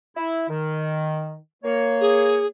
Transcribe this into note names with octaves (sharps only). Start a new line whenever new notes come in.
E4
D#3
A#3 C#5
G#4